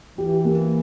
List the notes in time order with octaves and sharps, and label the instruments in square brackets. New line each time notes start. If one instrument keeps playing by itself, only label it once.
[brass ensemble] E3 [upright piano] G4
[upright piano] A#3